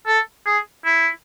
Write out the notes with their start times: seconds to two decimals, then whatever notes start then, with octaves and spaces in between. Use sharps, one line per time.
0.07 A4
0.46 G#4
0.85 E4